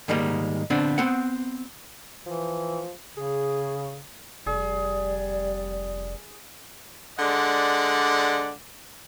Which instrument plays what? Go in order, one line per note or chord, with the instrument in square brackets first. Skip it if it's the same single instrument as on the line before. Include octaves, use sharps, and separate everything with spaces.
[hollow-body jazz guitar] G#2 D#3 G3 G#3 A#3
D3 B3 C4 D4
B3 C4 F#5
[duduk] E3 [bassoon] F3
[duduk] C#3 [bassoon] G#4
[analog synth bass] F1 [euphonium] G3 [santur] G#4 [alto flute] D5
[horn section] D3 G#3 D5 F#5